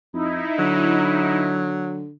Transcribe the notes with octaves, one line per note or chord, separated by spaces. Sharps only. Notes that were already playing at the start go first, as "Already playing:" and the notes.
F2 D#4 E4
D3 F#3